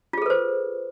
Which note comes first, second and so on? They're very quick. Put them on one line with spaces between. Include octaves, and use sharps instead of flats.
F4 G#4 A4 B4 C5